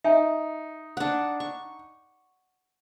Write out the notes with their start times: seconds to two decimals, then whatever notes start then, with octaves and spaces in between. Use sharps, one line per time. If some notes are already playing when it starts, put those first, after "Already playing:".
0.04 D#4 E5 G#5
0.97 D4 F#5
1.40 C#6